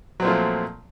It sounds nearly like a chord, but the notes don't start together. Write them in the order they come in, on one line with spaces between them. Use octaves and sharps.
F#3 C4 A#2 A3 F3